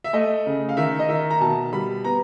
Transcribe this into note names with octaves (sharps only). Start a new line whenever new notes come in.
E5
A3 D#5
C#3
F5
D#3 E5
D#5
D#3 E5
A#5
B2 A5
G3 B5
B3 A#5